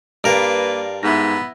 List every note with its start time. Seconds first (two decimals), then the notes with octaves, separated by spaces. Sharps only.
0.24 G2 A#3 A#4 B4 D5 F5 D7
1.03 G#2 B3 E4 A#6